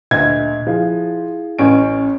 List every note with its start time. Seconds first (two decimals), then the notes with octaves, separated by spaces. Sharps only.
0.11 D2 A#2 D#5 E5 G#6
0.67 F3 E4 G#4 F5
1.59 A1 C#4 D7